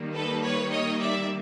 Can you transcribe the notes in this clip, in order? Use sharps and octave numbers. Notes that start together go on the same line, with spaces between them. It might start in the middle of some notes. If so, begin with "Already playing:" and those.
Already playing: D#3 G3 A#3
A4 B4
B4 C#5
C#5 D#5
D5 E5